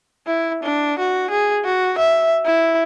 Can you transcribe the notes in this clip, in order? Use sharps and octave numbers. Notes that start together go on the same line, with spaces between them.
E4
D4
F#4
G#4
F#4
E5
E4